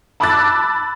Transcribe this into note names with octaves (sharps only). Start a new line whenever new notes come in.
A5 B5 D6 E6 F#6 A6